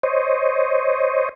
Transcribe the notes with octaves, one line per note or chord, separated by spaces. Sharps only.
C5 C#5 D#5